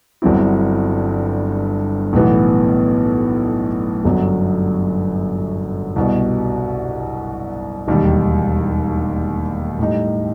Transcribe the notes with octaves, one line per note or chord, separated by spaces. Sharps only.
G1 G2 F#3 C4 E4
B1 A2 E3 B3
G1 F#2 F#3
C2 B2 G3
E1 D#2 D#3 G3
A2 G3 D#4